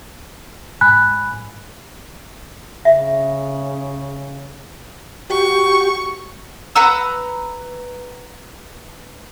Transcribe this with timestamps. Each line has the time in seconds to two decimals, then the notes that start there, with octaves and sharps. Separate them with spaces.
0.81 G#2 G#5 B5 F#6
2.85 C#3 E5
5.30 F#4 G4 C#6
6.75 B4 F#5 A#5 E6